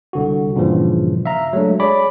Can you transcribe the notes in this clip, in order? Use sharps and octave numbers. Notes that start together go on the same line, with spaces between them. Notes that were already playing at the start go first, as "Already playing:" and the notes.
C2 D3 F#4
G2 A#2 C#3 E3 F3
E5 F5 A#5
F#3 G#3 A3 D4
G#4 C#5 D5 B5 D6